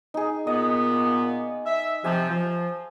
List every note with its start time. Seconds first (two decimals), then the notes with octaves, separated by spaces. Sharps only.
0.14 D#4 G#4
0.47 A#2 B3 D#5
1.66 E5
2.04 C3 F3 G#5 E6
2.30 F3